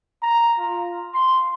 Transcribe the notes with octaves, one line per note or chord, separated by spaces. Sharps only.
A#5
F4
C6